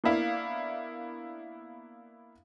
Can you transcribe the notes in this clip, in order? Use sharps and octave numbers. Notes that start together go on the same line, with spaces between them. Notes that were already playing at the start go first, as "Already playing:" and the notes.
A#3 B3 D4 E4 F5